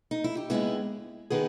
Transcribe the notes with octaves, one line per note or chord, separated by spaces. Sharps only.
D#4
E4
G4
D#2 D#3 G#3 B3 E4 G#4
D#3 G#3 B3 G#4 B4